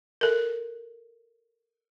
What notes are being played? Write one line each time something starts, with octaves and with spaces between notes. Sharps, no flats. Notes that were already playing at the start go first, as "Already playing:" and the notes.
A4 A#4